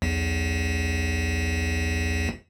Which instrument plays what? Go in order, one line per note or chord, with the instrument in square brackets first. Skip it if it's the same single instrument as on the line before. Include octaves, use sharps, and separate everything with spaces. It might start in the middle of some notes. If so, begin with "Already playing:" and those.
[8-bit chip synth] B1 E2